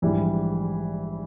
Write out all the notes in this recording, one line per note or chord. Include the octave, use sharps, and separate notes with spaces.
A#1 G#2 E3 G3